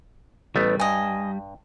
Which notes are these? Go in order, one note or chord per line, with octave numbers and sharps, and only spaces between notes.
A1 G3 A3 B3
G2 D#5 G#5